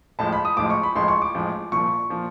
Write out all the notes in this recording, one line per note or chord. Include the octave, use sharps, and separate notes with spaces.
A1 A2 F3 G#3 A5
B5
D#6
A1 A2 F3 G#3 D6
C#6
B5
A1 A2 F3 G#3 C6
C#6
D6
A1 A2 F3 G#3
C2 A#2 F3 C#6
A#2 F3